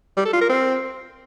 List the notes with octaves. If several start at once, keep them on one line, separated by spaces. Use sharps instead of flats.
G3
A4
F4
A#4
C4